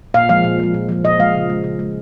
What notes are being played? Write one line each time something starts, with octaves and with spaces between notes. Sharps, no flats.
A#2 F5
F3 G#3 F5
A#2
F3 G#3
A#2
F3 G#3
A#2 D#5
F3 G#3 F5
C#3
G#3
C#3
G#3